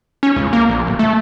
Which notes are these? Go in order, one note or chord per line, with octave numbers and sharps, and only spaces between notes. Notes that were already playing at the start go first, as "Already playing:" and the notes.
C#4
C#2
A#3
A#1
D1
A3